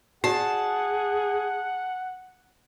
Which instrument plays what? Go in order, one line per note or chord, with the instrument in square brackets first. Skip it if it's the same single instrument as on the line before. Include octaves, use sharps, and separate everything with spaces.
[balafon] F#4 D5 [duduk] G#4 [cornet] F#5 [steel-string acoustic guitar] A5